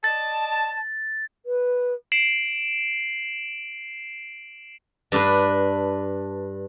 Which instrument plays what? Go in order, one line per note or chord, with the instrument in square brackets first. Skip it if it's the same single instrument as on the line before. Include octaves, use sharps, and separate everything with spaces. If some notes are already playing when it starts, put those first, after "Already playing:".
[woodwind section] D5 D#5 A5 [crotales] A6
[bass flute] B4
[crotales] C7 D7 E7 F#7
[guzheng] G2 D4 B4